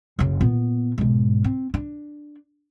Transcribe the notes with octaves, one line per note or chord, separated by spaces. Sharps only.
F#1 C#3
A#2 B3
B1 G#2
C4
D4